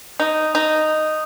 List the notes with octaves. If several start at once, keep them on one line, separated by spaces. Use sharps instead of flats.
D#4
D#4